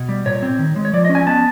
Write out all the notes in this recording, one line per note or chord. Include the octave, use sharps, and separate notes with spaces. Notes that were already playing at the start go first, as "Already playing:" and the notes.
Already playing: B2
G3
A#2 C#5
C4
D#3
G#3
C#5
F3 D5
D#5
C#4
G#5
B3 A5